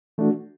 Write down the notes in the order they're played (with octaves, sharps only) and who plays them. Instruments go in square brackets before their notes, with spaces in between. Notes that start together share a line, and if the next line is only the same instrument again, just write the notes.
[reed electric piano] E3 A3 D4 F#4